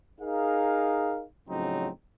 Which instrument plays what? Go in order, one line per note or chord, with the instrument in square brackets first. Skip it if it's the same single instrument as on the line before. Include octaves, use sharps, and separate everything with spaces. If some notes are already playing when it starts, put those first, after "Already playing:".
[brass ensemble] D#4 G#4 A#4 F5
A2 C#3 F3 F#3 C4 D#4